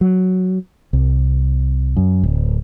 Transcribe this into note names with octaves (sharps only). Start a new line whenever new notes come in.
F#3
C2
F#2
D1